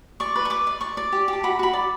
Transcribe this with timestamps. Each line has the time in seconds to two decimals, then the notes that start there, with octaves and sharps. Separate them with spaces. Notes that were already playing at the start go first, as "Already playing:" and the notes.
0.20 D5 C#6
0.36 B4
0.45 C#6
0.50 B4 D6
0.67 D5
0.81 D5 C#6
0.97 D5
1.12 G4
1.28 G4
1.33 A5
1.43 F#4 B5
1.59 F#4 B5
1.73 D5